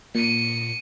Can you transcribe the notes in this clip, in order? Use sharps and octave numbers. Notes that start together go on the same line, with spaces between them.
A#2 C#7 D#7